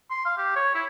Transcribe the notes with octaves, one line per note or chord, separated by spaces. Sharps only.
C6
F5
G4
C#5
E4